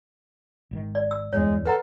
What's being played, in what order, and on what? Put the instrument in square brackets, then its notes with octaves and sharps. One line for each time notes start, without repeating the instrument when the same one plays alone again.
[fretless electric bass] G#1 D3 D#3
[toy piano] D5
E6
[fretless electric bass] D1 E2 G2 [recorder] G#3 [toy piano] C#5
[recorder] A4 [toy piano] B4 F#5 A#5